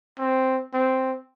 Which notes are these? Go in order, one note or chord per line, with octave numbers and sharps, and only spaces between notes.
C4
C4